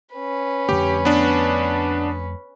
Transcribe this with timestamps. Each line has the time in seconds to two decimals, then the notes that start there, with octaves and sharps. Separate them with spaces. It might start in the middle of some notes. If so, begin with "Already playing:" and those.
0.15 C#4 B4
0.69 F2 D3 A3 G4
1.05 B3 D4